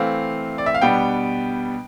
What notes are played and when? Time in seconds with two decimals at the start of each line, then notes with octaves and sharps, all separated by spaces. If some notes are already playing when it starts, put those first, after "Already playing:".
Already playing: E3 A3 C4 F5
0.58 D5
0.66 E5
0.74 F5
0.81 B2 G3 B3 D4 G5